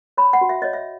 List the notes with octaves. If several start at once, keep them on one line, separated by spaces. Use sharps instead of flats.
C#5 B5
F#5
F#4
E5
C#5 D#5
E5